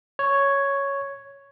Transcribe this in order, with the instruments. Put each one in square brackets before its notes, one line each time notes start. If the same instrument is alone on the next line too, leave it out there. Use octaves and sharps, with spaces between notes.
[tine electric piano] C#5